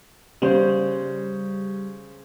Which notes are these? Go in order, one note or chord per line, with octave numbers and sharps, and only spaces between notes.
C#3 G3 C5